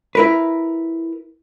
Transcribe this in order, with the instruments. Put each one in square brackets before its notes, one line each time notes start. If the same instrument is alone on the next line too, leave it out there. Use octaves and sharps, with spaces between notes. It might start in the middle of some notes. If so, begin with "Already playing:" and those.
[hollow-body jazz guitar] E4 A#4 B4